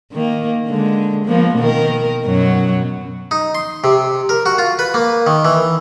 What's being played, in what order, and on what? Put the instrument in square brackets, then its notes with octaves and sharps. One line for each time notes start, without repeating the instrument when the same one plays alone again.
[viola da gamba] D#3 A#3
D3 G#3
F3 A#3 B3
B2 D#3 A#4
F#2 B2 F#3
[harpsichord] D#4
C6
C3
A#4
F#4
F4
B4
A#3
D#3
E3